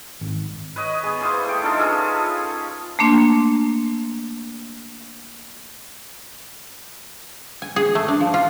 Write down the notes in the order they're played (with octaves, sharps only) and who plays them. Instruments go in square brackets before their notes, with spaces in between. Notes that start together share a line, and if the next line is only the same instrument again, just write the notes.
[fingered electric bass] G#1
[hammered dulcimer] B4 C#5 D#5
B3 G#4
E3 B3 C5 F5
A3 A4 G5
D4 D#4 F4 A4
C#4 F4 G#4 A4
[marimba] A3 A#3 D4 C6
[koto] G#5
G#4
A3
D4
F3
F4